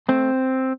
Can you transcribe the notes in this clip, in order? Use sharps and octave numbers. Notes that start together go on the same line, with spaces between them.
A3 C4